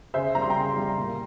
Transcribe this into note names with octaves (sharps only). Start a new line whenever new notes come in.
C#3 C5 E5
G3 A#5
C6
G5 A#5
C#3
G3
A#2